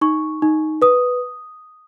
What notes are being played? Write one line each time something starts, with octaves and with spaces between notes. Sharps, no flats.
D#4 C#6
D#4
B4 D#6